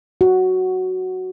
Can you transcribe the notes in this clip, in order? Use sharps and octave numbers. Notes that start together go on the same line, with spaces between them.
F#4